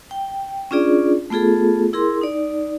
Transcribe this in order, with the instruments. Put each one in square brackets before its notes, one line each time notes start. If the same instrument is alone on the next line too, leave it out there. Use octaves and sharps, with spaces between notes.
[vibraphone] G5
C#4 D4 F4 G#4 D5
A3 B3 F4 G#4 A4
E4 G#4 A#4 C6
D#4 D5